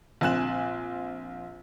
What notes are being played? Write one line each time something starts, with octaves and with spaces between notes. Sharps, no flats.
A#1 C4 G#5 F#6 E7